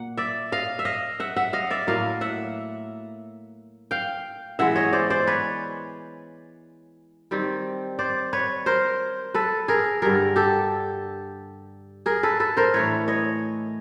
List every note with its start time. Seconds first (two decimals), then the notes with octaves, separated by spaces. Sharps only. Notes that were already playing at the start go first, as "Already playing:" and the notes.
Already playing: A#2 A#3 F#5
0.17 D5 E5
0.52 D#5 F5
0.79 E5
0.85 D#5 F5
1.20 E5 F#5
1.36 E5 F#5
1.53 D#5 F5
1.71 D5 E5
1.87 A2 F#3 A#3 D#5 F5
2.21 E5 F#5
3.91 F5 G5
4.59 E3 G#3 B3 E5 F#5
4.76 C#5 D#5
4.93 C5 D5
5.10 C5 D5
5.27 B4 C#5
7.31 D#3 G3 C4
7.99 C5 D5
8.33 B4 C#5
8.66 A#4 C5
9.34 A4 B4
9.68 G#4 A#4
10.02 G2 D3 G3 G#4 A#4
10.36 G4 A4
12.06 G#4 A#4
12.23 A4 B4
12.40 A4 B4
12.57 A#4 C5
12.74 A2 E3 A3 D4 B4 C#5
13.08 C#5 D#5